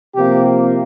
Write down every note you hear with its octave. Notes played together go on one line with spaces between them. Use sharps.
C3 F3 A#3 G4